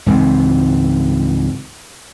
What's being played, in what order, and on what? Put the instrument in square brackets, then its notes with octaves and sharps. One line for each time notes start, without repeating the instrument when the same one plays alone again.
[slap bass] C#2 G#2 E3 C4